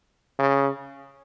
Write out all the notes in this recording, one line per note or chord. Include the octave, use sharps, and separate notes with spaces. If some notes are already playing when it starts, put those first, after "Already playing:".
C#3